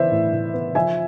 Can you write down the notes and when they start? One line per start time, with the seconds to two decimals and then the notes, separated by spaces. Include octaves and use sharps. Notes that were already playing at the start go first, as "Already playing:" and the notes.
Already playing: E3 B3 C5 D5 E5
0.12 A2
0.33 A2
0.54 B3
0.75 F3 E5 G#5